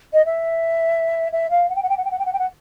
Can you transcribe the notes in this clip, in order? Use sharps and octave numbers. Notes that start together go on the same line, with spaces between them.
D#5
E5
E5
F5
F#5
G5
F#5
G5
F#5
G5
F#5
G5
F#5
G5
F#5